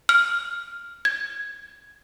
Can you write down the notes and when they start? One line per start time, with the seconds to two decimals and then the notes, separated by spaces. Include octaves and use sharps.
0.09 F6
1.05 G#6